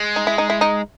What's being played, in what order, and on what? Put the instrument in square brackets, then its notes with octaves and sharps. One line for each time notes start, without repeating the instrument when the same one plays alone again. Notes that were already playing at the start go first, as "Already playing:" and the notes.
Already playing: [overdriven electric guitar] G#3
[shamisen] D#4
E4
D#4
E4
D#4